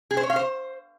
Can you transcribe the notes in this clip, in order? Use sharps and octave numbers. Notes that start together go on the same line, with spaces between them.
G#4
C5
C#5
F5
C5